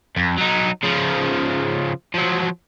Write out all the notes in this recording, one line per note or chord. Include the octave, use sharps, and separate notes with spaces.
F2
F#3 D#4
C#3 F3
F3 F#3